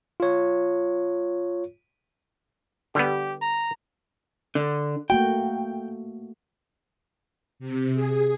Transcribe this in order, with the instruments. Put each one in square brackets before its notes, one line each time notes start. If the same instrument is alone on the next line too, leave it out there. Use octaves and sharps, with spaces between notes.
[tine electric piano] F4 C#5
[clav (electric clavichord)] D3 G3 B3 [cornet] G4
[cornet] A#5
[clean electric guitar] D3
[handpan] A3 A#3 F#4 [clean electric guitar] G5
[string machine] C3
G#4